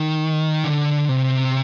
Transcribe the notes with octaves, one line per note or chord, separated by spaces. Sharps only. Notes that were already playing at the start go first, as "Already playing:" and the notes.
Already playing: D#3
D3
C3